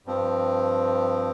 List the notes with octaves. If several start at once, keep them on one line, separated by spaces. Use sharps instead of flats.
G2 F3 C4